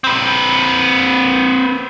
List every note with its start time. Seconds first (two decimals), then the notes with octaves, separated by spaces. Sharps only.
0.04 C4 B4